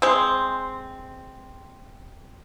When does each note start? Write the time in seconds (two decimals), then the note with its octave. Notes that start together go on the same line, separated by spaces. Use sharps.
0.02 G#3 C4